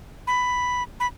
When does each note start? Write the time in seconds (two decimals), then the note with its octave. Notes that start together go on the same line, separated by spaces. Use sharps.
0.27 B5
1.00 B5